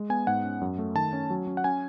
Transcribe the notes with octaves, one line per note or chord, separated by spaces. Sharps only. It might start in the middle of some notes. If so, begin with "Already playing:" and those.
Already playing: G#3
B3 G#5
G#2 F#5
C#4
F#2
A3
D#3 A5
C#4
F#3
C#4
F#5
C#4 G#5